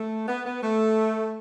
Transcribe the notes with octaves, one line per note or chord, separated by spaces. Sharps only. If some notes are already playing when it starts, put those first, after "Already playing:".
Already playing: A3
B3
B3
A3